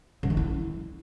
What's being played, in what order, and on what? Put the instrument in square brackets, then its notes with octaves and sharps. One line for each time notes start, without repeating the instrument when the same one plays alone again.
[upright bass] D3
D#3
E4